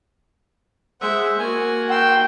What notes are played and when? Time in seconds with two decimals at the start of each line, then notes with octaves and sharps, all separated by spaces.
1.01 G#3 C5 E5 F#5
1.39 A#3 F#4 G#5
1.91 G5 C6 E6